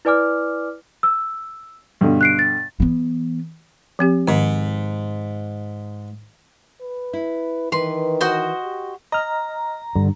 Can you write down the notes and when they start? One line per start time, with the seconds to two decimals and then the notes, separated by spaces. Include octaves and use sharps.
0.05 E4 B4 D5 G#5 D6 F6
1.03 E6
2.01 G2 B2 D3
2.21 F#6 C7 D7
2.39 A6
2.80 E3 B3
3.99 F3 C4 G4
4.28 G#2 D#3
6.81 B4
7.13 E4
7.72 D#3 E3 B4 C6
8.21 F#4 C5 D#5
8.64 G4
9.12 D#5 A#5 F6
9.95 G2 D3